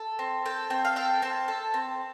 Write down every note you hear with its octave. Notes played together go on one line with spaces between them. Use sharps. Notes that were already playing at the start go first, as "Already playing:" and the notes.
Already playing: A4
C4
A4 G5
C4 G5
F5
A4 G5
C4 A5
A4
C4